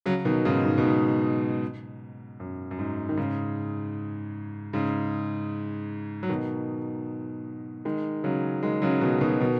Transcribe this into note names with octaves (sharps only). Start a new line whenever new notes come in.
C#3 F#3
B2 D#3
G#2 C#3
G#2
B2
G#2
F#2
F#2
G#2
D#3
G#2 C#3
G#2 C#3
F#3
B2 D#3
D#3 G#3
C#3 F#3
D#3 G#3
C#3 F#3
B2 D#3
B2 D#3
B2 D#3